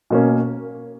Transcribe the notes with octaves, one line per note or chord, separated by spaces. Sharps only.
B2 A#3 C#4